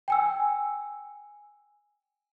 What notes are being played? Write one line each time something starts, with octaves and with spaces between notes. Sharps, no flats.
G5 G#5 E6